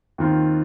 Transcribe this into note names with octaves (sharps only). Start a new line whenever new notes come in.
D#2 D#3 C4 F4